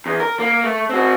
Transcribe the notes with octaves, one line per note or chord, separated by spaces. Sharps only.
E2
A#4
A#3
A3
C4 F#4